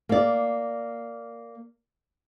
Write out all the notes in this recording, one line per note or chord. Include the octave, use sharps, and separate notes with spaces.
A#3 D5